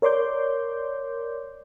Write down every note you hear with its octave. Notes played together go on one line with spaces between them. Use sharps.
A#4 C#5 D5 C6 D6 G6